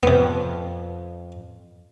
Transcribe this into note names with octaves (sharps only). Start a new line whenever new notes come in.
F2 C3 B3